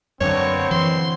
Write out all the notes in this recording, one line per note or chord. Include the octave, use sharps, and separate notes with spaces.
F#2 B2 D3 A#3 C4 C#5
E3 C6